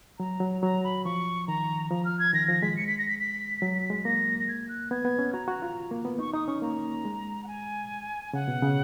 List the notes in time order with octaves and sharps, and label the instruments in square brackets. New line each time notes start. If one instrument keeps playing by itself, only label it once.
[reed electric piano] F#3 [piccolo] A#5
[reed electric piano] F#3
[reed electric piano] F#3 [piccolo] A#5
[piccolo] B5
[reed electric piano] F3 [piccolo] C#6
[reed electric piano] D#3 [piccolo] A#5
[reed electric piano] F3 [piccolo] A#5
[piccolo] F6
G#6
[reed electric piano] D#3 [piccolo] A#6
[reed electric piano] F3 [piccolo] A#6
[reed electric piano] G#3 [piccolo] B6
[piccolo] C#7
B6
A#6
B6
B6
[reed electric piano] F#3
G#3
[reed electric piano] A#3 [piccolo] A#6
[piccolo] A#6
G#6
F#6
[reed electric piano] B3 [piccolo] G#6
[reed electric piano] B3
C#4
[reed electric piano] F#4 [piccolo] A#5
[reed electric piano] F#4
F4
A#3
B3
[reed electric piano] D#4 [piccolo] C#6
[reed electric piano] D#4 [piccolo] D#6
[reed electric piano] C#4 [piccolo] C#6
[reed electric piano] A#3 [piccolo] A#5
[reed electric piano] G#3
[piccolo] F#5
G#5
[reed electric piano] C#3 [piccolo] F#5
[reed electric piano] B2
C#3